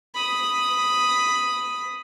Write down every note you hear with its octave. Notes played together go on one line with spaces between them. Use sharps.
B5 D#6